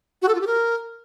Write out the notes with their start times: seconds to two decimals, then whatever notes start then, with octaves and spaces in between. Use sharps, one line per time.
0.22 F#4
0.28 A4
0.35 F4
0.41 G4
0.47 A#4